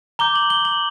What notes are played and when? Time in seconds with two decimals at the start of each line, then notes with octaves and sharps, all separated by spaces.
0.19 A#5 D6 G6 G7
0.35 F#7
0.50 G7
0.65 F#7